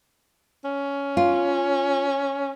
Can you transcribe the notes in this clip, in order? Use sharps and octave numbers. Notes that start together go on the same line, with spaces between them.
C#4
F4